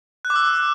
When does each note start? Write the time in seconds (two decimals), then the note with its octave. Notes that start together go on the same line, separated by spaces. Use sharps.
0.25 F#6
0.30 D6
0.36 E6